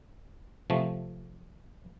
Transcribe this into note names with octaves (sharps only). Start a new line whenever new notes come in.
C3 F3 A3